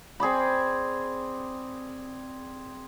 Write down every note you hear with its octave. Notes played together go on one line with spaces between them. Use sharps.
C4 G#4 D5 B5